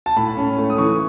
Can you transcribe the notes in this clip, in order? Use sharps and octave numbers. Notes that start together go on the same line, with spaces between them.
A5
A2 B5
C#4
A3
D#6
E3 C#6